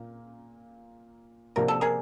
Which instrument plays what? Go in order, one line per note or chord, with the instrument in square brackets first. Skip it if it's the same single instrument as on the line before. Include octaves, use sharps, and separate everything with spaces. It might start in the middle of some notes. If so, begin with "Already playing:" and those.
Already playing: [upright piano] A#2 A#3
[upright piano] C3 F3 A#3 D4 F#4 [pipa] A#4
[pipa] A4
G#4 A#4